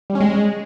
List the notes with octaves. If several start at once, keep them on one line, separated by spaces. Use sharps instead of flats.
G3
C#4
G#3